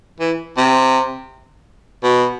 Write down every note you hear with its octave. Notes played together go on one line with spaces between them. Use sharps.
E3
C3
B2